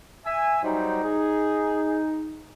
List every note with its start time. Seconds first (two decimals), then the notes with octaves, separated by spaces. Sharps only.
0.26 E5 G#5
0.63 F#3 G3 D#4 C5
1.03 G#4